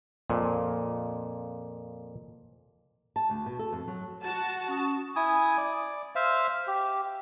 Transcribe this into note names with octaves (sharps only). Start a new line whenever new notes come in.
F2 A#2
A5
D2
B2
A4
F2
F#3
F#4 A5
C#4 C#6 D#6
E4 G#5 D#6
D5
C5 E5 F5
G4